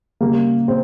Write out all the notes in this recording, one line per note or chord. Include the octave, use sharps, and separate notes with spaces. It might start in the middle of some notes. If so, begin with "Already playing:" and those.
C#3 G3 A#3
C4